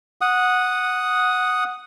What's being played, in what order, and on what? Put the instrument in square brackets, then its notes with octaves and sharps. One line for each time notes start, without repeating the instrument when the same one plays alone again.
[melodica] F#5 D#6